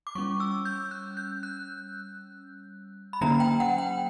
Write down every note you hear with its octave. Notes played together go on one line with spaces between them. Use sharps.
D6
G3 C#4 C#6
E6
G6
F#6
G6
F#6
B5
D3 F#3 A#3 C#4 A#5
G5
F#5
G5